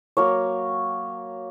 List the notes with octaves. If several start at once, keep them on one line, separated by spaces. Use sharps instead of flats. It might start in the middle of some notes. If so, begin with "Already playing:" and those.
F#3 A#3 C#5